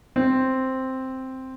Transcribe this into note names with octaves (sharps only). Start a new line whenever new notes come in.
C4